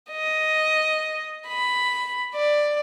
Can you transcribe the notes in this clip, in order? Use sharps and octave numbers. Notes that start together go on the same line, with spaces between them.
D#5
B5
D5